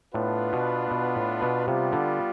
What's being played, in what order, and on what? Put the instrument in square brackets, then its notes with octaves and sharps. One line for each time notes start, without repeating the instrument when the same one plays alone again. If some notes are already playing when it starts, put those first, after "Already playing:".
[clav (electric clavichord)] A2 [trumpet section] B3 D4 F4 B4
[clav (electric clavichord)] B2
B2
A2
B2
[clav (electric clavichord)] C3 [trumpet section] G3 B3 F4
[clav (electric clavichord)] D3